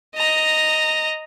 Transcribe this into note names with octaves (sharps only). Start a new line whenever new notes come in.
D#5 A#5